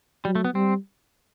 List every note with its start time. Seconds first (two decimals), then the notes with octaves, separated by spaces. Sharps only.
0.25 F#3 G3
0.35 A3
0.45 B3
0.54 G3 C4